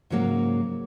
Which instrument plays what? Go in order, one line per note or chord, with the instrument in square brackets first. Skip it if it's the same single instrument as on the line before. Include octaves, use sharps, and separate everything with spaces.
[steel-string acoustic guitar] G#2 C#3 F#3 A#3